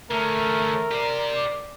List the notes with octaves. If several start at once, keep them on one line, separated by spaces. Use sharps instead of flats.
D3 A3 C#4 A#4
G4 C5 D5